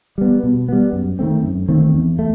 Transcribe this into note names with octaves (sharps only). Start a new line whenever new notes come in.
G3 B3
B2
G3 B3
F#2
D#3 A3 C4
F#2
D#3 A3 C4
E2
A3